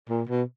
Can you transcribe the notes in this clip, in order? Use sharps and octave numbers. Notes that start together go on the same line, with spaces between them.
A#2
B2